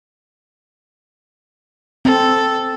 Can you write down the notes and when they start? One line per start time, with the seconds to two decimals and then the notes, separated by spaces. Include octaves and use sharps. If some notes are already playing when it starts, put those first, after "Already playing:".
2.05 C4 A4